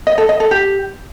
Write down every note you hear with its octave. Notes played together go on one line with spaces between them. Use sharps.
D#5
A4
D#5
A4
G4